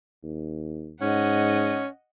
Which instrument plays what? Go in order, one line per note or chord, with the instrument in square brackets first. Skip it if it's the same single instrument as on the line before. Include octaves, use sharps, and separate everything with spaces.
[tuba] D#2
[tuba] G#2 [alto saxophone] C#4 [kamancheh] D#5 F#5